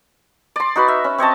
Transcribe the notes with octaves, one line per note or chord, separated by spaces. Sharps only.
D5 C6
D#4 F#4 B4
E5
C#4
C4 C#5 D#5 A5